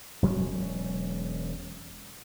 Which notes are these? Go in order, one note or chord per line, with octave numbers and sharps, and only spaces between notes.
E1 F#3 G#3 C#4